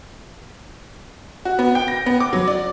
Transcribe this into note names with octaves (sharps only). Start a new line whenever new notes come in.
F#4
B3
G5
A#6
B3
D6
F#3
D5